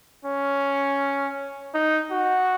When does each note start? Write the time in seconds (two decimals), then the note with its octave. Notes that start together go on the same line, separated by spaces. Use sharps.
0.25 C#4
1.74 D#4
2.11 F#4